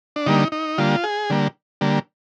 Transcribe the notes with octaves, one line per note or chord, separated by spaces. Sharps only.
D4
D3 G3 A#3 D#4
D#4
D3 G3 A#3 F4
G#4
D3 G3 A#3
D3 G3 A#3